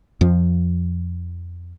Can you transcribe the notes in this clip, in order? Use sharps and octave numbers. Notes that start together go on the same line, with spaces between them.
F2 F3